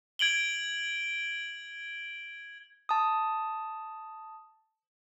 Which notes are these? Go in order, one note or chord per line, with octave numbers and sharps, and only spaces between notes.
G#6 D7 F#7 G7
A5 D#6